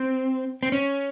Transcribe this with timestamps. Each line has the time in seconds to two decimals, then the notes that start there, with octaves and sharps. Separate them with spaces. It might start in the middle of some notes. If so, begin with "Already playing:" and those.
Already playing: C4
0.63 C4
0.72 C#4